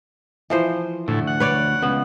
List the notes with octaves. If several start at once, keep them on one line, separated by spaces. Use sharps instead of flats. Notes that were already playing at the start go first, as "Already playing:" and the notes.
E3 F3 C5
D2 A2
F#5
B4 C#5 D5
C#2 B3